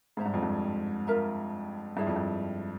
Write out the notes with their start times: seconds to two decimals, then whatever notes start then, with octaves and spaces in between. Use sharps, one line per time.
0.17 G#2 G#4 C5 E5 A#5
0.26 G2
0.34 F2
0.43 G2
1.07 F4 A#4 E5 A#5
1.97 G2 E4 G#4 C#5 E5
2.07 F2
2.16 G2